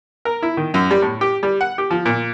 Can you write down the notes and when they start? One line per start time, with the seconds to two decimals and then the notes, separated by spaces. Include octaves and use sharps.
0.25 A#4
0.43 E4
0.57 D#3
0.74 F#2
0.91 G3
1.02 A2
1.21 G4
1.43 G3
1.61 F#5
1.78 G4
1.91 F3
2.06 A#2